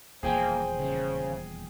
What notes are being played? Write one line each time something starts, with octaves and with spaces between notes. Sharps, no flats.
D#1 E2 F3 A#3 G#4 C5 G5 G#5
C#3